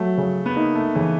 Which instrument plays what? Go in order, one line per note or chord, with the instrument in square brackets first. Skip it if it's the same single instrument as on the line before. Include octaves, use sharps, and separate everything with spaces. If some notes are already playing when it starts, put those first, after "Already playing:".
Already playing: [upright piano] F#3 [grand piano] A3
[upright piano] C#3
[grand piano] B3
[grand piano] A#3 [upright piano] D#4
[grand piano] A3
[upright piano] C#3 [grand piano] E3